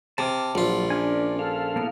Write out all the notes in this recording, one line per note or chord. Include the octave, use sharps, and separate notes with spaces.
C3 A5 D6 F6
A#1 F#3 F4
C#4 D4 A#4 G#5
A4 F5
A#3 B3 E4